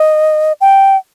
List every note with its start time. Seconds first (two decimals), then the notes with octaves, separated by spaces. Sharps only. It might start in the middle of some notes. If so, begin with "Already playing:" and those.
Already playing: D#5
0.61 G5